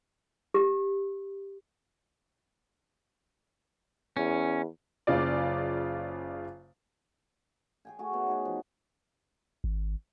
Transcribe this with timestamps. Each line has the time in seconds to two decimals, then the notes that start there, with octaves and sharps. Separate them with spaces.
0.54 G4
4.17 E2 C#4
5.07 F#1 C#3 F4 D5
7.85 G#4 G5 G#5
7.99 A3 F#4 G#4
8.13 B3 C#5 E5
8.27 D#4 F#4 G#4
8.45 F3
9.64 G#1